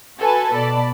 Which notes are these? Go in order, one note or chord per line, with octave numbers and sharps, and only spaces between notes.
F#4 A4 B4 G#5 A5
B2 D5 A5 B5